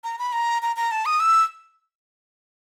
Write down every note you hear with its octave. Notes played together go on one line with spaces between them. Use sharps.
A#5
B5
A#5
A#5
A#5
A5
D#6
E6